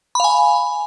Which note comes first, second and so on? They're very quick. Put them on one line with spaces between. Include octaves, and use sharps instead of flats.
B5 F5 G#5